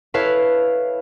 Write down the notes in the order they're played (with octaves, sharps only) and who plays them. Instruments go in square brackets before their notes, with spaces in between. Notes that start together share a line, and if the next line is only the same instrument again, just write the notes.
[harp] E4 A4 B4 C#5 F5